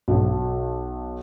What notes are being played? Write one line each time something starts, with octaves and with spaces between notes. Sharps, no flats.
B1